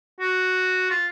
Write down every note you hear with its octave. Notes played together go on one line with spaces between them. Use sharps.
F#4
F4